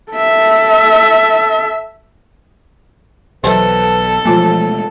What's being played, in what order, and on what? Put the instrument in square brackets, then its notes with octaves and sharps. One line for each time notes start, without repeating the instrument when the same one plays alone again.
[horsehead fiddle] A4 E5
[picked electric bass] B1 [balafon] E3 F#3 [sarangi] A4 [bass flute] B4
[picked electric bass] B2 G#3 A3 [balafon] E3 F4 G#5 [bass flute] F3